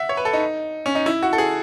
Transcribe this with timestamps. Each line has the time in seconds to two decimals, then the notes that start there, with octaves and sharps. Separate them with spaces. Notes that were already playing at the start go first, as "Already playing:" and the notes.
Already playing: E5 F#5
0.09 C#5
0.17 B4
0.25 A4
0.33 D#4
0.86 C#4
0.95 D#4
1.06 E4
1.23 F#4
1.33 A4
1.38 G#4